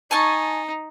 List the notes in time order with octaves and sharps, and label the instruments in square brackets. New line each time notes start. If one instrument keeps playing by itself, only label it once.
[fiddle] D#4 [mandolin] G#5 A5 C#6